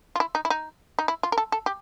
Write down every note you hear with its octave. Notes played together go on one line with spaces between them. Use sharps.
F4
E4
D#4
E4
D#4
D#4
E4
F4
A#4
A4
A4
G4